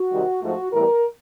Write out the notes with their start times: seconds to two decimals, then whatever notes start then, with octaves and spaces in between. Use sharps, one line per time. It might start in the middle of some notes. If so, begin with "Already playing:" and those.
Already playing: F#4
0.11 C3 D#3 G3
0.42 G#2 F3 A3 F#4
0.73 A2 E3 G3 B3 A#4